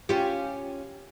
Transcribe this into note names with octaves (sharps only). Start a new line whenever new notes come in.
C#4 F4 G4